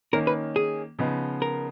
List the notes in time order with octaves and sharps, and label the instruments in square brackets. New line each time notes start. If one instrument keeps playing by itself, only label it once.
[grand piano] D#3 A#3 C#4 [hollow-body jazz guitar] A#4
[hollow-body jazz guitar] B4
G#4
[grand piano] C#3 F3 B3 D#4
[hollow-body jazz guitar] A#4